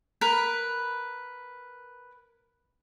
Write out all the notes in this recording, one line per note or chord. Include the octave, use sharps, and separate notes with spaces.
A#4 B4 B5